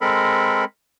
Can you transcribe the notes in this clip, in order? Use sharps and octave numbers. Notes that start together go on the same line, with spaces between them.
G#3 C4 A4 A#4 B5